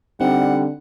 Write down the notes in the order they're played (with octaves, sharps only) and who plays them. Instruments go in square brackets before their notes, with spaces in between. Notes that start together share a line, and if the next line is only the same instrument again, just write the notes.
[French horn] D3 [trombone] G3 [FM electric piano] C4 D#4 [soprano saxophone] F#5